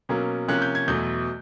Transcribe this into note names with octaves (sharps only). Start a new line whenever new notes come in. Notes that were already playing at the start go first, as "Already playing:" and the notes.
B2 F#3 A#3 C#4
C3 F3 A#3 C#4 F#6
G6
G#6
E2 B2 F#3 A3 G6